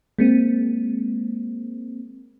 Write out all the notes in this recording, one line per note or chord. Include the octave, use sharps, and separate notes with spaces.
G#3 A#3 C4